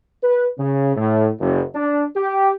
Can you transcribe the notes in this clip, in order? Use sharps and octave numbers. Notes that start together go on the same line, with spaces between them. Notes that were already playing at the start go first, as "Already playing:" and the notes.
B4
C#3
A2
F#1
D4
G4